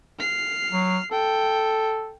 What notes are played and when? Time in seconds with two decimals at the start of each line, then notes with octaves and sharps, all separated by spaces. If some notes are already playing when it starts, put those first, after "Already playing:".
0.19 F6 C7
0.72 F#3
1.11 A4 G5